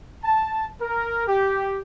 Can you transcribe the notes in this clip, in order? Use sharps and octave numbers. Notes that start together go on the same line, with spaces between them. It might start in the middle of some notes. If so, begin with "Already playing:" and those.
A5
A#4
G4